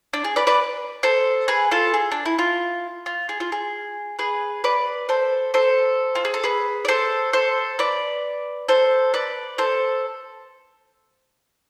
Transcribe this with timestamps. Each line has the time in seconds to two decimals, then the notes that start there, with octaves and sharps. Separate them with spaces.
0.13 D4
0.24 G#4
0.36 B4 D5
0.47 B4 D5
1.03 A4 C5
1.48 G#4 B4
1.71 F4 A4
1.94 G#4
2.12 D4
2.25 E4
2.39 F4
3.06 F4
3.29 G#4
3.40 F4
3.52 G#4
4.19 G#4 B4
4.64 B4 D5
5.09 A4 C5
5.54 A4 C5
6.15 F4
6.25 G#4
6.34 A4
6.44 G#4 B4
6.85 D5
6.88 A4 C5
7.33 A4 C5
7.79 B4 D5
8.68 A4 C5
9.14 B4 D5
9.58 A4 C5